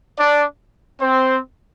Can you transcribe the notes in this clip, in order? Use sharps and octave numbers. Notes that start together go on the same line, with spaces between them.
D4 D5
C4 C5